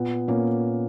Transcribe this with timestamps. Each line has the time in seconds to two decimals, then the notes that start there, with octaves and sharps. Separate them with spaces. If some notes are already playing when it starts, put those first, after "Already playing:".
Already playing: A#2 B3
0.27 A#2 A#3 C#4